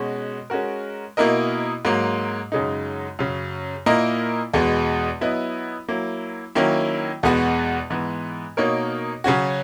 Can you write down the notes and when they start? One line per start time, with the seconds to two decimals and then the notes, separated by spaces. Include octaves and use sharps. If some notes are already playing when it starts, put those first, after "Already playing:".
Already playing: B2 G#3 C#4 F#4
0.50 G#3 C#4 F#4 A#4
1.17 B2 A#3 E4 A#4 D#5
1.85 G#2 F#3 A#3
2.52 F#2 C#3 G#3 D#4
3.19 F#2 C#3 F#3
3.86 A#2 A#3 E4 A#4 D#5
4.54 E2 B2 G#3 B3
5.21 F#3 B3 E4 B4 D#5
5.88 F#3 A#3 E4
6.55 D#3 F#3 A#3 C#4 E4
7.23 E2 B2 G#3 B3 F#4
7.90 G#2 E3 B3
8.57 B2 A#3 D#4 A#4 C#5
9.24 C#3 F#3 C#4 F#4